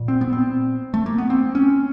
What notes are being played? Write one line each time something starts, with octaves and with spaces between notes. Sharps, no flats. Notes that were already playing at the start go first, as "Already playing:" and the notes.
Already playing: A#2
C4
B3
C4
A3
A#3
B3
C4
C#4